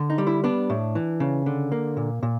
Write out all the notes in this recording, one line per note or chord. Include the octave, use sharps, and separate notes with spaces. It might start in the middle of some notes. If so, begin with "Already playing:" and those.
Already playing: D3
D#4
G3
E4
B3 D4
A2
E3
C#3
D3
A#3
A#2
A#2